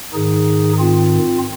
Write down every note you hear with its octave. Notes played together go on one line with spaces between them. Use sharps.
G#2 D#3 D#4 G#4
C4 F4